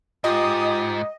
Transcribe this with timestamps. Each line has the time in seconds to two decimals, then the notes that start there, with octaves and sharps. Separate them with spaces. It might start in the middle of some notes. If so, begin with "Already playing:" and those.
0.24 G#2 F4 G4 D#5 D#6